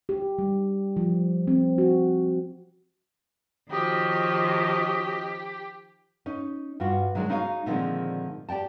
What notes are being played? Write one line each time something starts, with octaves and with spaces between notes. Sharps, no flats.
G4
G3
F3
C4
F#4
D#3 F3 C#4 F#4 G4 D#5
C#4 D#4
G2 F4 F#4
D#3 F#3 G#3 D4
G#3 D#4 E4 F#4 C#5 F5
A#2 D3 D#3 F3 G#3 C4
G4 D5 G5 A5